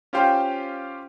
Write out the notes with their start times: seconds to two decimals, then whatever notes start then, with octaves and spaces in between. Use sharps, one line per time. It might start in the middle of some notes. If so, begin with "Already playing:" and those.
0.13 C#4 F4 G4 C5 F5 G5